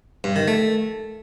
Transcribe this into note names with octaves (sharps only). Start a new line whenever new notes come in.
G2
D#3
A3